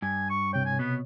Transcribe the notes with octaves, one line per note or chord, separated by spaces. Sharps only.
G2 G#5
C#6
C3 C#5 G5
G#5
B2 B3